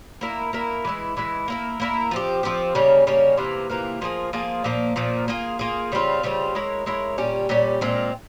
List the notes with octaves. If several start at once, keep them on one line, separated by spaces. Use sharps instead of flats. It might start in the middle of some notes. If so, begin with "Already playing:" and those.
A#3 E4 A#4
A#3 E4 A#4
E3 G#3 E4
E3 G#3 E4
A#3 E4 A#4
A#3 E4 A#4
F3 C4 G4
F3 C4 G4
C#3 G3 A#3 C#4
C#3 G3 A#3 C#4
C3 E3 A#3 F4
C3 E3 A#3 F4
F3 A#3 F4 G#4
F3 A#3 F4 G#4
A#2 F3 A#3
A#2 F3 A#3
A#3 F4 G#4
A#3 F4 G#4
C#3 G3 C4 F4
C#3 G3 C4 F4
G#3 E4 A#4 C#5
G#3 E4 A#4 C#5
A#2 G3 C#4 G4
A#2 G3 C#4 G4
A#2 G#3 C4 F4